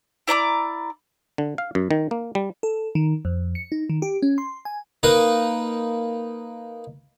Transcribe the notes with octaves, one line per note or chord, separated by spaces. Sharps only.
E4 D5 A#5 D6
D3
F5
F#2
D#3
A#3
G3
A4
D#3
F2
C#7
D#4
D#3
G4
C#4
C6
G#5
A#3 D#4 B4